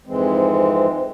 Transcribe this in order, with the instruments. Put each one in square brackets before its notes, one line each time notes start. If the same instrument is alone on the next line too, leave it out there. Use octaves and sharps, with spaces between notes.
[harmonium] F2 G#2 E3 G#3 C4